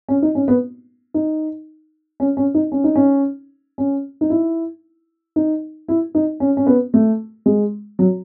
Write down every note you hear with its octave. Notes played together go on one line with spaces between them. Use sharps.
C#4
D#4
C#4
B3
D#4
C#4
C#4
D#4
C#4
D#4
C#4
C#4
D#4
E4
D#4
E4
D#4
C#4
C#4
B3
A3
G#3
F#3